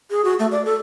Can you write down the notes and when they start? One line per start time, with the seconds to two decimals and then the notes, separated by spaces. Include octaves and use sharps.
0.11 G#4
0.25 F#4
0.39 A3
0.51 D5
0.65 A4